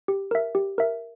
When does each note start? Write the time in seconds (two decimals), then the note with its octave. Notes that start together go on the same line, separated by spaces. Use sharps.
0.08 G4
0.31 A#4 E5
0.55 G4
0.78 A#4 E5